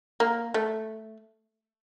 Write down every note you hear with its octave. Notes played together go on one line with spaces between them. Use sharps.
A#3
A3